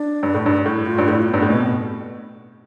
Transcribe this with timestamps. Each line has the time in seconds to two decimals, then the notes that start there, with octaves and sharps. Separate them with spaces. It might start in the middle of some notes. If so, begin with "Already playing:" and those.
Already playing: D4
0.23 G2
0.34 A2
0.46 G2
0.65 A2 E4
0.86 F4
0.98 G2
1.07 A2 E4
1.22 A3
1.29 B3
1.34 G2
1.42 A2
1.50 B2 C4